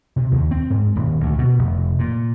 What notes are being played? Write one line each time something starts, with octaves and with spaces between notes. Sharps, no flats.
C3
D#2
C4
G#2
D#1
D2
B2
F1
A#2